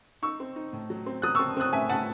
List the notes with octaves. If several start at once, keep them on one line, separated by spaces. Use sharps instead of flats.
D#4 C#6 E6
C4
D#4
A2
F#3
C4
F#3 D#6 F#6
C4 C#6 E6
C4 D#6 F#6
A2 E5 G#5
A2 F#5 A5